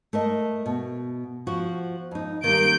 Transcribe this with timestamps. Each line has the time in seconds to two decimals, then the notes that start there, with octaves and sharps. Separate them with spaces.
0.13 A3 A#4 D#5
0.66 B2
1.47 F3 F#4
2.11 F2 D#4
2.44 D#3 G3 A#3 G6 D7